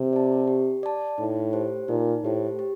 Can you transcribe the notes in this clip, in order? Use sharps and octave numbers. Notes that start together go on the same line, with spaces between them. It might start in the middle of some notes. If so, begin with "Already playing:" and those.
Already playing: C3
D5 A5
G4
D5 A5
A2 D#4
G4 C5
A#2 D#4
A2 G4 C5
G4